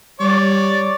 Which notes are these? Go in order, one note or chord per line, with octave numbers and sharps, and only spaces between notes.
G3 C#5 D5